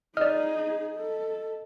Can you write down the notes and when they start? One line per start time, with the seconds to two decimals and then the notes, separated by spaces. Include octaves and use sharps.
0.17 D#4 G#4 D5 D#5 F6
0.96 A4